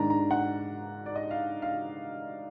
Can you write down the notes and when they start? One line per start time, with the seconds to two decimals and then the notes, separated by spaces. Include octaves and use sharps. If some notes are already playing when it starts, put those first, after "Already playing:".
Already playing: G#2 D#3 G#3 D4 A#5
0.10 A#5
0.31 F#5
1.06 D5
1.15 D#5
1.31 F5
1.62 F5